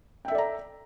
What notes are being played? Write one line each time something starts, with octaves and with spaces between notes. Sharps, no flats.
A4 D5 E5 G5 A#5